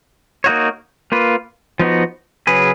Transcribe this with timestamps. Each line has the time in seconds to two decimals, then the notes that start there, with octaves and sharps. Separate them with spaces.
0.44 A#3 D#4 F#4 C#5
1.12 A#3 F4 B4
1.80 F3 B3 D#4 F#4
2.47 C#3 F#3 C#4 G#4 B4